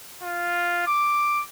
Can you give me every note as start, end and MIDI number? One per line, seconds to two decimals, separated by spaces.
0.23 0.83 65
0.87 1.43 86